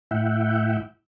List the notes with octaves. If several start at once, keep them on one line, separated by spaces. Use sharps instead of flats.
A2 E4 E5 F#5 G5